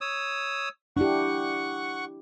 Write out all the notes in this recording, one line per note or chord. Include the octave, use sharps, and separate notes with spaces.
C#5 D#6 E6
D4 E4 G4 F#5 C#6